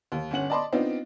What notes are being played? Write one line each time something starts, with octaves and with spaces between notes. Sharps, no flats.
D#2
G1 C#4 F#5 F#7
D5 D#5 A5 B5 C6 D6
B3 C4 D4 D#4 F4